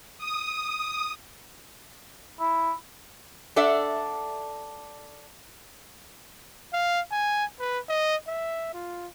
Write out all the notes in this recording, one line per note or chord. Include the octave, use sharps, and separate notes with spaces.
D#6
E4
D4 A4 D5 E5 F#5
F5
G#5
B4
D#5
E5
F4